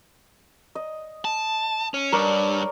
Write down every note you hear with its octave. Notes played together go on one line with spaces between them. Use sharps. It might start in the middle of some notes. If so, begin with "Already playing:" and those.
D#5
A5
C#4
G2 A#4 C#5 D5